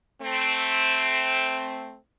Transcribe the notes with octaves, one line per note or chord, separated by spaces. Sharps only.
A3 C4